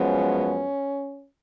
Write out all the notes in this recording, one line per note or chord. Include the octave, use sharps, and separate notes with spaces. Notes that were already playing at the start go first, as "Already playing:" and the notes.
Already playing: F#2 F3 G#3 B3 C#4